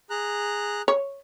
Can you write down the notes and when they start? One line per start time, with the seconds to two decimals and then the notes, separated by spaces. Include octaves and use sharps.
0.10 G#4 A#5 F#6
0.88 C#5